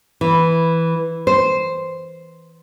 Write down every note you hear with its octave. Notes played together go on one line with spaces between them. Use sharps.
E3
C5